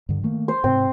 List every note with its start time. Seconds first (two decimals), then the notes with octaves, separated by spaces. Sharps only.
0.09 G2 D3
0.23 D#3 A3 A#3
0.48 C5
0.64 G#2 C3 C4